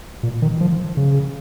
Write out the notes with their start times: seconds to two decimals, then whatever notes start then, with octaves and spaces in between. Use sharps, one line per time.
0.23 A#2
0.42 D#3
0.61 F3
0.97 C#3